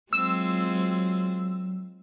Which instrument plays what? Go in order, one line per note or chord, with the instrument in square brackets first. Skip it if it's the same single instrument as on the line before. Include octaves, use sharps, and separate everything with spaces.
[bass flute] F#3 [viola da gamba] G#3 C4 F4 [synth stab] E6